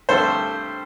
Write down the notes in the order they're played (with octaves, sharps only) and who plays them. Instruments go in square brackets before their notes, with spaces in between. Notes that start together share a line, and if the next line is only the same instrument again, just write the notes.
[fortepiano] G2 D3 A3 C4 A4 C5